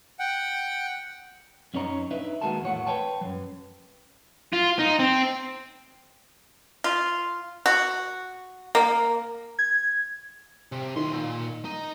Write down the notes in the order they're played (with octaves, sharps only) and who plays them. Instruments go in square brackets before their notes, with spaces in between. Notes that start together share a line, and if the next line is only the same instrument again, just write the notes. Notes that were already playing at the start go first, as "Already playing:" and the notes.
[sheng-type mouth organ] F#5 G5
[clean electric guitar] F#2 C#4 D#4 C#5 A#5
D4 D#4 B4 E5
D#2 G#3 F#4 A#4 A5
E2 A2 C#5 F#5
B4 C#5 G5 A5
F#2 F#3
[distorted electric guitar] F4
D#4
C4
[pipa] F4
F#4
A#3
[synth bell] G#6
[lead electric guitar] C3
[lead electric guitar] B1 C6 [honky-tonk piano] D#3
[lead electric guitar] A#2
D#4